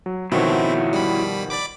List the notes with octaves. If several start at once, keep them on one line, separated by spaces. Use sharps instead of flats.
F#3
B2 D#3 F3 C4 E4 F#4 C#5
G3 B5
D5 B5 D6